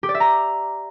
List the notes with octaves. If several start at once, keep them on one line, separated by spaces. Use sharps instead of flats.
G4
D5
E5
A#5